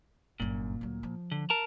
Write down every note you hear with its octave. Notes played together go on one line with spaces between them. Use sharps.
G1 F#2 A#2
D2 F#3
F3
D3
A#4 A5 A#5